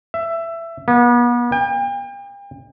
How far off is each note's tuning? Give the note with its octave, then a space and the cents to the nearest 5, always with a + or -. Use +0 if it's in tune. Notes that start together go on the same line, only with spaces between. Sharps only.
E5 +15
B3 -40
G5 +40